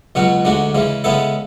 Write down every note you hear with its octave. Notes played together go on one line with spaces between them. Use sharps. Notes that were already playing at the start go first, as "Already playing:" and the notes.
C#2 B2 F#3 C#4 F#4
D2 D3 G#3 D4 F#4
C#3 E3 G#3
C#3 G#3 B3 E4 A4